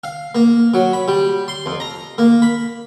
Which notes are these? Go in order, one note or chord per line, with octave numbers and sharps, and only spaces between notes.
F5
A#3
F#3
B5
G3
C6
F2
A#5
A#3
B5